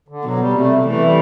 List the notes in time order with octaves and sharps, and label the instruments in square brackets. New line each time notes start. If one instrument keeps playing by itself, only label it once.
[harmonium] D3
[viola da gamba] B2 [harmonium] F#3
[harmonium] G3
[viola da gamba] C3 [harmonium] A3
[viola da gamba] E3 [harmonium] A3
[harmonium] G3